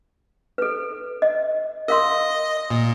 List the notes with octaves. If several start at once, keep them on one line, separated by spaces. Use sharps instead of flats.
A4 B4
D#5
A#4 D#5 F5 C6
A#2